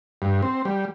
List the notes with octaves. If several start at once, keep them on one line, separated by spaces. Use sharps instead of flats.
G2
C4
G3